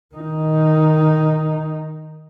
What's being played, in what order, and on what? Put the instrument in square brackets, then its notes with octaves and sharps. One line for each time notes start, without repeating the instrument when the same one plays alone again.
[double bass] D#3 D#4